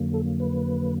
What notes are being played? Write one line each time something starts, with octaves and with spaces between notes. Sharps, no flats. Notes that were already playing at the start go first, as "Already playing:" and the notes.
Already playing: F2 D3 F#3 A#3
A4
B4